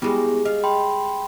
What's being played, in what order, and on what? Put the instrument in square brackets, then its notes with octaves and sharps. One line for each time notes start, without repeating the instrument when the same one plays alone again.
[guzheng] G3 G#3 [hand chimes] B3 E4 G4
[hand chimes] D#5 [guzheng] F5
[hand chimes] G5 B5 C6